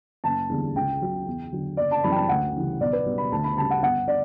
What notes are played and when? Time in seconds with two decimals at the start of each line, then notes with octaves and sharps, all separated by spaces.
0.24 F#1 A5
0.49 E2 D3 G3
0.75 C#2 G5
1.01 C#3 F#3
1.26 E2
1.52 D3 F#3
1.77 F#1 D5
1.91 A5
2.04 F#2 E3 G3 B5
2.11 G5
2.16 A5
2.29 D2 F#5
2.55 C#3 E3 G3
2.80 B1 D5
2.93 B4
3.06 B2 G3
3.18 B5
3.32 D2 A5
3.44 B5
3.57 C#3 G3 A5
3.70 F#5
3.82 G1 F#5
4.08 D5